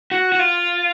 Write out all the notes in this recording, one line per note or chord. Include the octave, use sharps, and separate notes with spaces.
F#4
F#4
F4